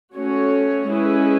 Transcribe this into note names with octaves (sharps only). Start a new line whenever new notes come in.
A3 C#4 F#4 C#5
G#3 C#4 E4 G#4 B4